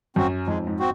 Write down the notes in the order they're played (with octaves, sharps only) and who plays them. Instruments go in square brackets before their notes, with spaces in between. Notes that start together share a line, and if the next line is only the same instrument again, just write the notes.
[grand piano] F#2 [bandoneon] C4 F#4
[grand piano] F2 G#2 [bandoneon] G#3
[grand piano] G#2
[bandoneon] C4 F#4